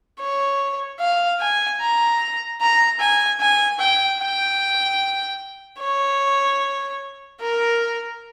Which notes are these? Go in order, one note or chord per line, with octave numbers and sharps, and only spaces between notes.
C#5
F5
G#5
A#5
A#5
G#5
G#5
G5
G5
C#5
A#4